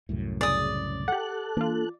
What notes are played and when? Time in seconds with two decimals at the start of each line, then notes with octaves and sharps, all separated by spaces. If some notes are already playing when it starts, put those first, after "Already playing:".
0.09 C2 F#2 A2
0.41 C#3 G#4 D5 D#6
1.08 G4 A4 F#5 F#6
1.57 E3 A#3 D4 F4